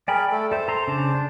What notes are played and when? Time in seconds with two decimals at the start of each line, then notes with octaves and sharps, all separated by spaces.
0.08 G#4 A#4 D5 G5 B5
0.32 A3 A4
0.52 A4 C5 E5
0.68 A4 A#5 C6
0.88 C#3 D4 A5
1.14 D4